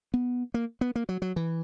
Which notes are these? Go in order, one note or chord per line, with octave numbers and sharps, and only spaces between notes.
B3
A#3
B3
A#3
F#3
F#3
E3